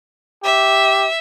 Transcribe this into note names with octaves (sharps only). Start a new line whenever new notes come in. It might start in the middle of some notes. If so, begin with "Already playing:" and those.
G4 E5